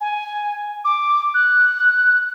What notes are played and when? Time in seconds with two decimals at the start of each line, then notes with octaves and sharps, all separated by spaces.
0.01 G#5
0.85 D6
1.34 F#6